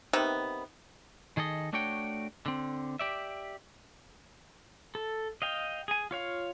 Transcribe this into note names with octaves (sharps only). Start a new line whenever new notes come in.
C3 D#3 B3
D#3 G#4 A4 D#5
A3 D4 F#4 C#5 G5
D3 C4
G4 D5 E5
A4
D#5 F5 G5
G#4 G#5
F4 C#5 F5